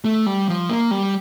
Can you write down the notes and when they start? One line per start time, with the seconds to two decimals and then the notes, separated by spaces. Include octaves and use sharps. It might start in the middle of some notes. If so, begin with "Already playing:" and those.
0.05 A3
0.26 G3
0.48 F3
0.69 A#3
0.91 G3